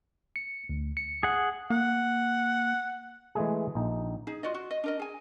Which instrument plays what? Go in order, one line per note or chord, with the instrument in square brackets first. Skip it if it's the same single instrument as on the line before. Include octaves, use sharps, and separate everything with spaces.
[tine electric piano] C#7
D2
C#7
[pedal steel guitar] G#4 F#5
[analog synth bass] A#3 [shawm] F#5
[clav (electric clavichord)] E3 G#3 A3 G#4
A#1 D#4
[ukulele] D#4 G#4
F4 F#4 D5 D#5
F#4
D#5
D4 A#4 D#5
G#4 G#5